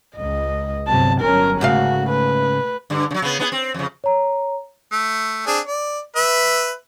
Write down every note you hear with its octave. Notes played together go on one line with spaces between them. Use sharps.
C#2 D#5
G1 C3 F#3 A5
G1 F#3 C#4 A#4
G#2 C#3 A3 F#4 F5
B4
G2 D3
C#3 F#3
C#3 B3
B3 D4 G#4
C4
F2 C#3
C#5 A#5
A3
C4 D4 G#4
D5
B4 E5